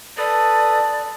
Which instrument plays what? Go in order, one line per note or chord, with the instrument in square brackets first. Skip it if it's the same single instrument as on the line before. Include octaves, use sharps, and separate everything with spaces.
[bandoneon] A4 B4 D#6 [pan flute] D5 [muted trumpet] A5